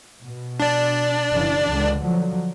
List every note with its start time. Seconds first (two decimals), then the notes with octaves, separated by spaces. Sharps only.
0.24 B2
0.60 D4 D5
1.31 F#1 C#3 E3
1.69 C#2 D3
2.02 D3 F3 F#3